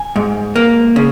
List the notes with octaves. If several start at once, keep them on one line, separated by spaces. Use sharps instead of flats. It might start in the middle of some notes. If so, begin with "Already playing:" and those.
Already playing: G#5
G#2
A#3
C#3